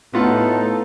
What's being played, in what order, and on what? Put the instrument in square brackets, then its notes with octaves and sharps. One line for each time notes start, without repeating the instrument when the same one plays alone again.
[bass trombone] A2 [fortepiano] B3 F4 F#5 [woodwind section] D#4 A4